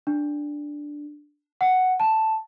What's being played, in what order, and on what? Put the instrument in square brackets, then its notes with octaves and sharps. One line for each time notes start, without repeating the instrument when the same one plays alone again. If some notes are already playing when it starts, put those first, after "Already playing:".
[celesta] D4
F#5
A5